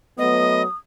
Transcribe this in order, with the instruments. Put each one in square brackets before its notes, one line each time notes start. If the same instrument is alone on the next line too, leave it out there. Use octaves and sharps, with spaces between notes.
[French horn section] F#3 A3 B3 [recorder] D#5 [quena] D#6